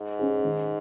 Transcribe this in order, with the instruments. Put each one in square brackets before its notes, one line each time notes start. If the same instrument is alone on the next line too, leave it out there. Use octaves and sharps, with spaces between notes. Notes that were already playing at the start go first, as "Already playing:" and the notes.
Already playing: [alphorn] G#2
[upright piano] C#4 G#4
D#3